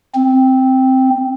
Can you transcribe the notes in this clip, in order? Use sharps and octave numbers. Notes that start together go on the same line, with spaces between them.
C4